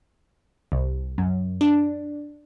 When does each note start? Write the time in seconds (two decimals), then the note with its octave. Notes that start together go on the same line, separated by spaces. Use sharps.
0.72 C2
1.18 F#2
1.61 D4